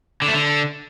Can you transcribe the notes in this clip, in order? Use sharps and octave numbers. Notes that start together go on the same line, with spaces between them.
D3
A3
D3